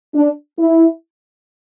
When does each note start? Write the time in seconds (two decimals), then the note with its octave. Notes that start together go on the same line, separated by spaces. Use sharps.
0.15 D4
0.59 E4